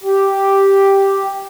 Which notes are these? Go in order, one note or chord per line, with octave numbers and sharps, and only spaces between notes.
G4